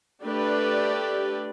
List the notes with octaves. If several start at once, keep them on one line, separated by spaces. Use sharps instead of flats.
A3 D4 G4 B4 D5